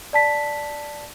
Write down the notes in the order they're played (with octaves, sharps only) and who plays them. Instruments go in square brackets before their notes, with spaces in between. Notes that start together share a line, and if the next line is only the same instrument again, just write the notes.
[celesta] D5 A5 B6